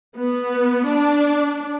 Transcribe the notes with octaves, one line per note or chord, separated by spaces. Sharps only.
B3
D4